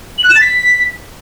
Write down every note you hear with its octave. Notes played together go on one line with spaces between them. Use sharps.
F#7
F#6
E7
A6
B6